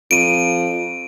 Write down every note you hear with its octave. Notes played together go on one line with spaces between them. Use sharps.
F2 D7 D#7